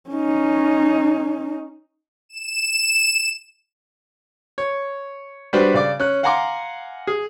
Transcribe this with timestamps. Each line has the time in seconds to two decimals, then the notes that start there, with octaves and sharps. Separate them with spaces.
0.10 C#4 D#4
2.29 E7
4.58 C#5
5.53 G3 D4 F#4 B4 C5
5.74 C#3 D5 D6
6.00 C#4 F#6
6.23 F5 F#5 G#5 A#5 C6 D6
7.07 G#4